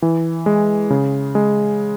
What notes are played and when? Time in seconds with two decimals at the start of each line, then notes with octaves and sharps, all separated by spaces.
0.02 E3
0.46 G#3
0.90 C#3
1.35 G#3